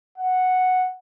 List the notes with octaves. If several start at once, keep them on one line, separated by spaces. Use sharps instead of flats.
F#5